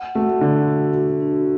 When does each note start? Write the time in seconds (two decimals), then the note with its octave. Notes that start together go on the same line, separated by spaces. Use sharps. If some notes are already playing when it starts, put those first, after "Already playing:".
Already playing: F#5
0.15 A3 F#4
0.41 D3 F#4
0.68 F#4
0.94 F#4
1.21 D4